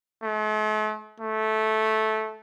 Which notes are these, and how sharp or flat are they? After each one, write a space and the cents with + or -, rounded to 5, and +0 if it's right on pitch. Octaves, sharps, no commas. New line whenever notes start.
A3 -45
A3 -10